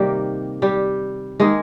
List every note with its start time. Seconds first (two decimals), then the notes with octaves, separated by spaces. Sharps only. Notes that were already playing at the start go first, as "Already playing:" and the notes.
Already playing: C3 D#3 G3 A#3 G4
0.62 G3 G4
1.40 D#3 G#3 A#3 G#4